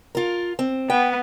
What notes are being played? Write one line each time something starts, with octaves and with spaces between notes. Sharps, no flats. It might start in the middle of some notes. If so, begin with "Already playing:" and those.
F4 A#4
C4
B3 G5